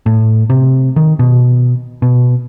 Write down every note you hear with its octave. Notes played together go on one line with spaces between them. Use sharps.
A2
C3
D#3
B2
B2